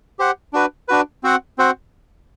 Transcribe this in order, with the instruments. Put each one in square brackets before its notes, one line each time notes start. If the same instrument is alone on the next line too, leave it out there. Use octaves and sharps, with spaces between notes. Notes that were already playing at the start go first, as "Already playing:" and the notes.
[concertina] G4 C5 F#5
D4 F#4 B4
D4 F#4 B4
C4 F#4 C5 F#5
C4 F#4 C5 F#5